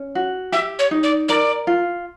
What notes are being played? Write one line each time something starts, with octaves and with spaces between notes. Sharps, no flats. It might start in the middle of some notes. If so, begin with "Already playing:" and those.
Already playing: C#4
F#4
G4 E5
C#5
D#4
D5
A#4 D5
F4